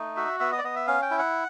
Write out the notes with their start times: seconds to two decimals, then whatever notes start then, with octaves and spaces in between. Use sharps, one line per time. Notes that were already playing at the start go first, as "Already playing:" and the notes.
Already playing: A3 D#4
0.16 F#4 E5
0.40 B3 E5
0.52 D#5
0.58 D5
0.64 B3 D#5
0.76 E5
0.87 C#4 F5
1.02 G5
1.11 E4
1.19 F#5